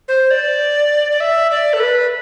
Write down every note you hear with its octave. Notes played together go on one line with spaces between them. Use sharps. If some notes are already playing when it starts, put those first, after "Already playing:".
C5
D5
D5
E5
D5
A4
B4